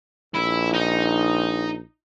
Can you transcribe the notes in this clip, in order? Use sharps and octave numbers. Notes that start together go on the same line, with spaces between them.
A#1 E4
D#4